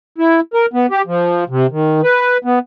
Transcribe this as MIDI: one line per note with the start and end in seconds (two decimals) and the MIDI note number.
0.18 0.40 64
0.54 0.66 70
0.73 0.86 59
0.91 1.02 67
1.07 1.44 53
1.49 1.67 48
1.72 2.01 51
2.03 2.37 71
2.45 2.59 59